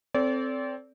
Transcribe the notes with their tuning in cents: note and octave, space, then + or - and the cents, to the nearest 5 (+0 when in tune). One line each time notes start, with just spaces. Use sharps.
C4 +0 A4 +0 D5 -35